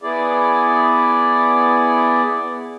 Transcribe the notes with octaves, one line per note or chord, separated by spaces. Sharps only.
B3 E4 G#4 D5